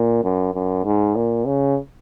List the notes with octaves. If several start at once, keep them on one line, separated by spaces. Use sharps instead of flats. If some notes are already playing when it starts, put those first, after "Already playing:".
Already playing: A#2
F#2
F#2
G#2
A#2
C#3